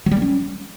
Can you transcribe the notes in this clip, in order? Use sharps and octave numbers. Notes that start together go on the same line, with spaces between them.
F#3
G3
A#3
C#4